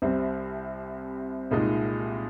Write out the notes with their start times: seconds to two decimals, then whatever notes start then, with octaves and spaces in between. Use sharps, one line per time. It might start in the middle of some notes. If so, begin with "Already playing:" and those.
0.02 C2 C3 G3 C4
1.51 C2 A#2 G#3 D#4